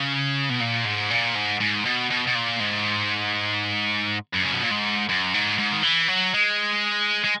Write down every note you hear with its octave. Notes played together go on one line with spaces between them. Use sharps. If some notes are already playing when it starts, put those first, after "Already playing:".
Already playing: C#3
B2
A#2
G#2
A#2
G#2
G#2
B2
B2
B2
A#2
G#2
F#2
C#3
B2
A#2
G#2
F#2
G#2
G#2
D#3
E3
F#3
G#3
G#3